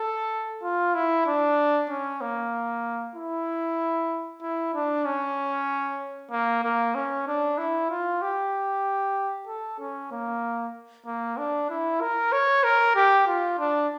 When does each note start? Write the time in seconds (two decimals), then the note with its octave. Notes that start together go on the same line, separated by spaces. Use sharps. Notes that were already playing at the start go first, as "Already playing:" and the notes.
Already playing: A4
0.63 F4
0.95 E4
1.27 D4
1.90 C#4
2.21 A#3
3.16 E4
4.42 E4
4.74 D4
5.05 C#4
6.31 A#3
6.64 A#3
6.95 C#4
7.27 D4
7.58 E4
7.90 F4
8.22 G4
9.47 A4
9.79 C#4
10.11 A#3
11.06 A#3
11.38 D4
11.70 E4
12.01 A#4
12.32 C#5
12.64 A#4
12.95 G4
13.27 F4
13.59 D4